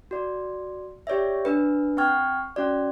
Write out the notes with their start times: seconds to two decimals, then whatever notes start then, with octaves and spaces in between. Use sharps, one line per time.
0.11 F#4 D5
1.07 G4 C#5 D5 E5
1.45 D4 B4
1.97 C4 F#5 G5 C#6 F6 G#6
2.56 C#4 F#4 D5